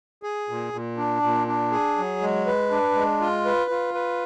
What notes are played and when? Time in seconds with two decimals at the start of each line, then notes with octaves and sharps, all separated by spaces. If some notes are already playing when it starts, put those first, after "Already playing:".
0.23 G#4
0.49 A#2
0.73 A#2
0.97 D4
1.22 A#2
1.47 D4
1.72 G#4
1.97 F#3
2.22 G#3
2.47 B4
2.71 D4
2.95 G#3
3.21 F4
3.45 B4
3.70 F4
3.94 B4